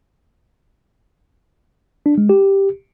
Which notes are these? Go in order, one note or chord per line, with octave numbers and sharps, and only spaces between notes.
D4
G#3
G4